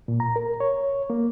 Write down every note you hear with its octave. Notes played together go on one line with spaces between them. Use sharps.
A#2
A#5
A#4
C#5
A#3